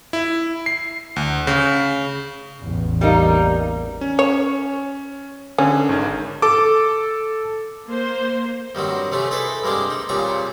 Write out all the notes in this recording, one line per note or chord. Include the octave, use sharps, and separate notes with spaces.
E4
C7
D2
C#3
A1 E2
G3 A#3 D#4
C#4
C#5
D3 C#4 G#4
G#1 D#3 F6
A4 D6
A#3 C5
G2 D#3 F#3 C4
C3 A3 C4 C#4
D#4 E4 G#4 A4 B4
G2 G#3 A#3 C4 D4
D#4
A#2 C#3 G3 C4 C#6